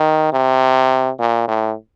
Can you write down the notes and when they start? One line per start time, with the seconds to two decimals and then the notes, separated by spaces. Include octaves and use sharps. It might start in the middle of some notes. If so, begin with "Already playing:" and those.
Already playing: D#3
0.33 C3
1.19 A#2
1.48 A2